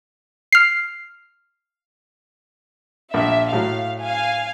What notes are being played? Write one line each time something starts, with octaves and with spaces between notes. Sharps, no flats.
F6 C7
A#1 A#3 E5
A2 F#3 F5
F5 G#5